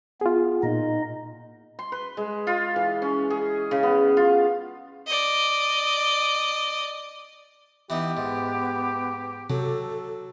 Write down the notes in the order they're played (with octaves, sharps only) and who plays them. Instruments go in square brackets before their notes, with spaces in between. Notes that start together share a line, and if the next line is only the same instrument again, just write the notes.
[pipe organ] B3 [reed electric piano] F4 G#4
[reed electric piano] A#2 [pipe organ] D#4 D#5
[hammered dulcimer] C6
B4
G#3
F4
E3
C#4
G#4
C#3
B3
F4
[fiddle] D5 D#5
[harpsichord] E3 D#4 [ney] B3 [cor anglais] G4
[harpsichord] G#2
[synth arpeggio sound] C3 [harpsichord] F#3 [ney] A4